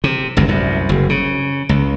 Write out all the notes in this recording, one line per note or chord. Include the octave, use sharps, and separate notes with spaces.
C3
G1 C#2 F#2
C2 F#2
F#1
C#3
C#2